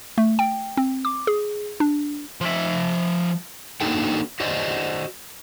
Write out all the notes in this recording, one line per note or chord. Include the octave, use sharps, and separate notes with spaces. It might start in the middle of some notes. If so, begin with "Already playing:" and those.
A3
G5
C4
D6
G#4
D4
F3 E5
A#3 D4 D#4 F#4 A4 G5
F#4 C5 D5 D#5